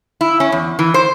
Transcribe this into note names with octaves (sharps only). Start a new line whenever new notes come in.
E4
C#4
E2
E3
C5